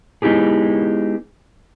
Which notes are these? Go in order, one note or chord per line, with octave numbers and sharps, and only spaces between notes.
G#3 B3 D#4 E4 G4 G#4